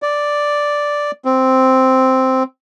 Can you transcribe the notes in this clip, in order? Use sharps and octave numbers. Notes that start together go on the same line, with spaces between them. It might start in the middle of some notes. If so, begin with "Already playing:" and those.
D5
C4